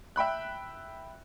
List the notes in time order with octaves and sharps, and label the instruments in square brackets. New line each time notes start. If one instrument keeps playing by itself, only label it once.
[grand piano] E5 G5 B5 F#6